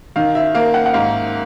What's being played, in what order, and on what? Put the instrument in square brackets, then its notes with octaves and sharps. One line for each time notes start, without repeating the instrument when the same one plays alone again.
[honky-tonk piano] D#3 [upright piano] F5
[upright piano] E5
[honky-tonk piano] A#3 [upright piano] F5
[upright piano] F#5
F#5
[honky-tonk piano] G#2 [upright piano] F5